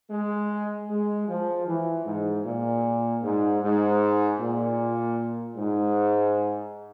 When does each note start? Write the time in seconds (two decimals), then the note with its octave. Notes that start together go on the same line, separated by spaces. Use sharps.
0.11 G#3
0.90 G#3
1.28 F3
1.67 E3
2.06 G#2
2.45 A#2
3.23 G#2
3.62 G#2
4.40 A#2
5.56 G#2